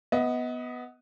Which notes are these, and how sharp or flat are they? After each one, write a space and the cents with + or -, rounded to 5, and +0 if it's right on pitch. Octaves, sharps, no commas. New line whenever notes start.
B3 +0 D#5 +30